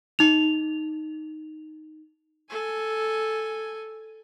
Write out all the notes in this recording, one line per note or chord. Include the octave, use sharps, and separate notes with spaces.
D#4 F7
A4 G#5